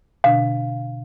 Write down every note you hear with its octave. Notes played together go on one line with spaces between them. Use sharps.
B2 D3 D4 F5